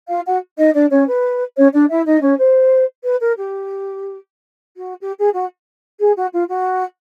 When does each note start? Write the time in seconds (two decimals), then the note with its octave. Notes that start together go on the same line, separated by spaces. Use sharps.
0.09 F4 F5
0.25 F#4 F#5
0.58 D#4 D#5
0.75 D4 D5
0.91 C#4 C#5
1.07 B4
1.56 C#4 C#5
1.73 D4 D5
1.89 E4 E5
2.06 D#4 D#5
2.22 C#4 C#5
2.39 C5
3.04 B4
3.21 A#4
3.37 G4
4.77 F#4
5.01 G4
5.17 G#4
5.34 F#4
6.00 G#4
6.16 F#4
6.33 F4
6.49 F#4